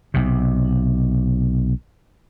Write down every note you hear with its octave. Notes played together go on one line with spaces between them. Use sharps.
B1 C3